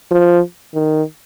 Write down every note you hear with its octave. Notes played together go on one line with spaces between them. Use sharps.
F3
D#3